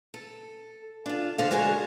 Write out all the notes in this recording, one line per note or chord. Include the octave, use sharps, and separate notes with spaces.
A4
D4 F4
D3 C5 F5
G#3 A#3 D4 F#4 G#4 C#5